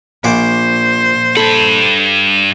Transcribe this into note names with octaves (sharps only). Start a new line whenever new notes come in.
A#1 A#2 C5 F#5 D6
G2 A4 B5